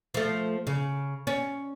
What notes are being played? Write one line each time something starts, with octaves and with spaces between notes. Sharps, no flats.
F3 A3
C#3
C#4